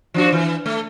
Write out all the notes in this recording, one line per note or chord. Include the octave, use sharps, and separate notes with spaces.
F3 D4 F#4
E3
A3